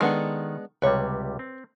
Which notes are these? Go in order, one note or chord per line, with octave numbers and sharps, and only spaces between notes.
D#3 G#3 B3 D4 A4 F#5
C#2 C3 G3 B4 C#5
C4